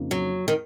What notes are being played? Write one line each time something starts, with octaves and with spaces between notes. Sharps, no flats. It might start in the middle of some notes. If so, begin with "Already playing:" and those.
Already playing: F2 C#3 F3 A#3 D#4
F#3
D#3